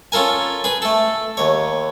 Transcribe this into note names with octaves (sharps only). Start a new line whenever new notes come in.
C#4 F4 A4 A#4 G#5
G#4 B4
A3 A4
D#2 C#5